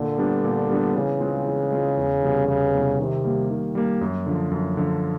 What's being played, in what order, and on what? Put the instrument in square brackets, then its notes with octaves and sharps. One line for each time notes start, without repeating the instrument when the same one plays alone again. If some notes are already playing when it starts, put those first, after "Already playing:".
Already playing: [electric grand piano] A#2 [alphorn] D3
[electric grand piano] G3 B3 D4
A#2
G3 B3 D4
[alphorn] C#3 [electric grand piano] E3
[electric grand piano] G#3 C4 F4
E3
G#3 C4 F4
E2
C3 E3 G3 B3
[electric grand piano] E2 [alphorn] C#3
[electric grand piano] C3 E3 G3 B3
[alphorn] C3 [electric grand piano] D#3
[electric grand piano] G3 A#3
D#3
G3 A#3
F#2
D3 F3
F#2
D3 F3